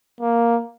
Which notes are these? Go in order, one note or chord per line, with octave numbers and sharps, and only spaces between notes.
A#3